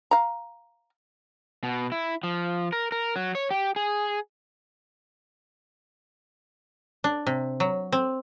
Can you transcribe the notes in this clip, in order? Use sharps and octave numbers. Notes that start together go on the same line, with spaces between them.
F5 A#5
B2
E4
F3
A#4
A#4
F#3
C#5
G4
G#4
D4
C3
F#3
C4